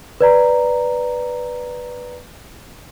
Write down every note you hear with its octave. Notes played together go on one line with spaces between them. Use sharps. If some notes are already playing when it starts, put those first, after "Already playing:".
B4 D5 A#5